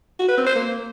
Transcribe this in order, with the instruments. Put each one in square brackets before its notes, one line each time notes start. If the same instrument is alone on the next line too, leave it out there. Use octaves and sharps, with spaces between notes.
[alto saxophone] F#4
B4
C4
C5
A#3